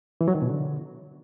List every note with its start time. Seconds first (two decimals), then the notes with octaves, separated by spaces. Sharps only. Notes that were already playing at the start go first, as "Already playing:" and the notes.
0.21 E3
0.28 F#3
0.35 D#3
0.42 B2
0.49 D3